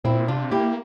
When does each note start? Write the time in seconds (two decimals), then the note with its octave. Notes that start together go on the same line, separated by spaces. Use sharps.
0.04 A#2 C4 E4
0.28 C3 D4 F4
0.51 A#3 E4 G4